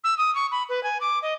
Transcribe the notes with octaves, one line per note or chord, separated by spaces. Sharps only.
E6
D#6
C#6
B5
B4
G#5
D6
D#5